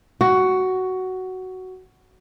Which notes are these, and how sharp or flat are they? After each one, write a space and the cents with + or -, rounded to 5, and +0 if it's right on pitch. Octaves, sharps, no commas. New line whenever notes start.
F#4 +10